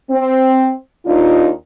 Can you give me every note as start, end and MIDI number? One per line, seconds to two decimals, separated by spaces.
0.10 0.72 60
1.06 1.50 39
1.06 1.50 62
1.06 1.50 63
1.06 1.50 65